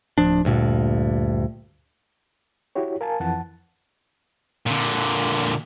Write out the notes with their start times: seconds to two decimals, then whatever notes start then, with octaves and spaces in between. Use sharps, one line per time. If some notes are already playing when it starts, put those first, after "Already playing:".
0.18 D1 F3 D4
0.45 D2 G2 A#2
2.75 E4 F#4 G4 C#5
3.01 A#4 F5 G#5 A5
3.20 F2 E3 F#5 A5
4.66 A#2 D3